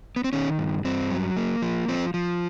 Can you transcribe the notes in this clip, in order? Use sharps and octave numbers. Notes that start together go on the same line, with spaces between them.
B3
C4
D#3 C#4
G2
G2 C4
F#3
A#3
F3
F3 C4
F3